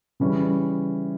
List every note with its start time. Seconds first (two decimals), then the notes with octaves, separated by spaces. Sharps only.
0.20 C#3 E3 G3 C#4